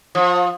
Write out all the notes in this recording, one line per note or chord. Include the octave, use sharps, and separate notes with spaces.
F3